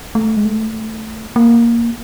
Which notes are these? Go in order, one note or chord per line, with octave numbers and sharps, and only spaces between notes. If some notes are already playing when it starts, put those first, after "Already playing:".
A3
G#3
A3
A#3